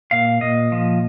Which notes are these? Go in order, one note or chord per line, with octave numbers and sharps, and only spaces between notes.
A#2 F5
A#2 D#5
F3